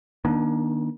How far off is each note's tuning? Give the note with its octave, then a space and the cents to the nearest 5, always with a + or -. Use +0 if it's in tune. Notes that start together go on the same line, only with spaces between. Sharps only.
D#3 +0 A#3 +40 D4 +0